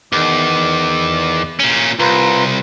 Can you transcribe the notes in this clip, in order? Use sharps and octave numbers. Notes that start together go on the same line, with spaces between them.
E2 D#3 D6
A#2 C#4
C2 F4 B4 A#5